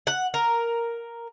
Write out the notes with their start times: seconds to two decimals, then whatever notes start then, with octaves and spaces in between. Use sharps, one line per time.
0.07 F#5
0.34 A#4